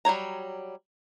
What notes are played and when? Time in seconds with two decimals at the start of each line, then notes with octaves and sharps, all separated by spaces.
0.05 F#3 G3 C#5 A#5